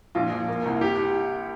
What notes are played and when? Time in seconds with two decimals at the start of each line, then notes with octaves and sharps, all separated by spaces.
0.15 A#1 F4
0.31 A#1
0.48 A#3
0.65 C2
0.81 G4